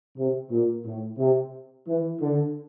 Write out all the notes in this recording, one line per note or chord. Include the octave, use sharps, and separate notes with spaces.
C3
A#2
A2
C3
E3
D3